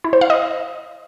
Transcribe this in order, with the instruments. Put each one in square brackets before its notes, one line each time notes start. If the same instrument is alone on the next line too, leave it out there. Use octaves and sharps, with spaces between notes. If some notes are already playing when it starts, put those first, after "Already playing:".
[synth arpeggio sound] E4
C5
F5
D#5